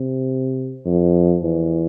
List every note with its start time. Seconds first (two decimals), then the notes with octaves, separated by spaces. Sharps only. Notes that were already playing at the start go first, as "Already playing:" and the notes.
Already playing: C3
0.85 F2
1.43 E2